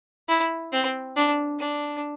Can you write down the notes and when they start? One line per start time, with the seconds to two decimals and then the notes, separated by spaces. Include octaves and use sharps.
0.28 E4
0.72 C4
1.16 D4
1.59 D4